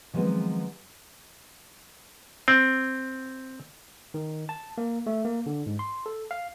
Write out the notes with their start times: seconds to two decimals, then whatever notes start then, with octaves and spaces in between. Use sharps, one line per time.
0.13 D#3 F3 F#3 G#3 B3 C4
2.48 C4
4.14 D#3
4.49 A5
4.78 A#3
5.07 A3
5.25 A#3
5.46 D3
5.66 G#2
5.79 C6
6.06 A4
6.31 F5